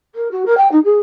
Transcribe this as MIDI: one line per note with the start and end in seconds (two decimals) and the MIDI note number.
0.15 0.30 70
0.31 0.43 66
0.45 0.56 70
0.57 0.70 79
0.71 0.79 63
0.84 0.99 68